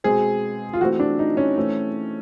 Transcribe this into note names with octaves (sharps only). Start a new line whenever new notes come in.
B2 G#3 C4 G#4
F4
E3 A3 C4 F#4
D4
D#4
C#4
E3 A3 C4